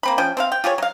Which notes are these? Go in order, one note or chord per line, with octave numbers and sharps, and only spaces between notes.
A#3 C4 B5
F3 C#4 G5
C4 A4 F5
G5
F4 G4 G#4 C#5
F#3 F5